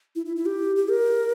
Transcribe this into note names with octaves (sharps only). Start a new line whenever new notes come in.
E4
E4
E4
G4
G4
A#4